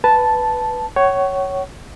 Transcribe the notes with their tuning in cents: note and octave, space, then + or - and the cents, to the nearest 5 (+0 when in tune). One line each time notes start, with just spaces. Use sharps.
B4 +0 A5 -5
C#5 +0 F#5 +40